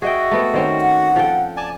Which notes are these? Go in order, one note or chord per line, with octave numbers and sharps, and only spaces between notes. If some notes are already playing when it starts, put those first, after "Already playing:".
F#4 G#4 D#5 E5 G5
A3 B3 C4
D#3 C4 C#4
F#5
F3 A4 G5
D5 G#5 A5